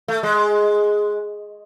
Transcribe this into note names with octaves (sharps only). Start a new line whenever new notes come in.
A3
G#3